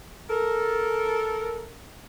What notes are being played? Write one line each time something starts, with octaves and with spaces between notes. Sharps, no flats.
A4 A#4